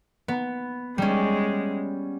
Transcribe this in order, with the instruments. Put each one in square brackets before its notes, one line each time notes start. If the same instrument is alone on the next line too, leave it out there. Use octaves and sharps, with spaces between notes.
[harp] B3
[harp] G3 C#4 [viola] G#3